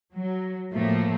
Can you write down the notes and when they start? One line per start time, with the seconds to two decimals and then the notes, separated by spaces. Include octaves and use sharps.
0.14 F#3
0.72 A2 F3 A3 A#3